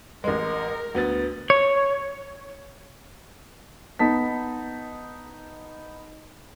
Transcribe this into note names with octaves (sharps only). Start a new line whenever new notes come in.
A1 G#3 A#4
D2 B3 A6
C#5
B3 D#4 A5 B6